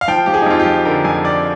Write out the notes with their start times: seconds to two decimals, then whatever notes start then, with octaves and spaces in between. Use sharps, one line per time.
0.01 F5
0.08 F3 G5
0.26 F3 G4
0.34 G#4
0.42 D#4
0.46 F2 F4
0.60 G4
0.66 F3
0.85 D3 A#4
1.04 F2 G#5
1.24 F2 D5